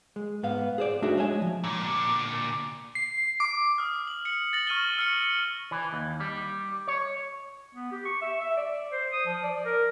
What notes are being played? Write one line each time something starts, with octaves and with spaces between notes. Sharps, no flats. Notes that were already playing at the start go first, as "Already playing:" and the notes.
G#3
G#2 B3 F5
G#4 C5 D5
A3 D4 D#4 F#4 G#4 E5
G#3 C#5 D#5 E5 G#5
F3
A#2 D3
C7
D6
D#6 F6
F#7
C#7 F#7
A6 A#6 F#7
C#6 F6 D#7 F#7 G7
E6 F6 C#7
E3
D#2
G3
C#5
B3
G4
C#6
E5
E5
D5
C5
D#6
F3
D5
A#4